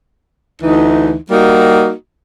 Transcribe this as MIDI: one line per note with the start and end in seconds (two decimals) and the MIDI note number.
0.62 1.15 38
0.62 1.15 52
0.62 1.15 63
1.30 1.93 55
1.30 1.93 58
1.30 1.93 63
1.30 1.93 66